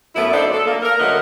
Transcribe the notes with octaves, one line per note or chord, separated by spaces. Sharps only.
F#2 A3 B3 E4
D4 D#4 A4 C5 D5
A4
A#3
A#4
D3 F#3 A3 F#4 B4 D#5